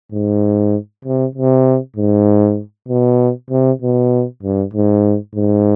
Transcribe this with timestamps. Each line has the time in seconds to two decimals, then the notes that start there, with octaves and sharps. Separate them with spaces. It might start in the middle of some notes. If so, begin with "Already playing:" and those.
0.12 G#2
1.05 C3
1.35 C3
1.97 G#2
2.88 B2
3.50 C3
3.82 B2
4.43 G2
4.74 G#2
5.35 G#2